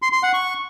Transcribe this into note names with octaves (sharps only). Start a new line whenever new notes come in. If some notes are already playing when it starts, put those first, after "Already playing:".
C6
C6
F#5
C#6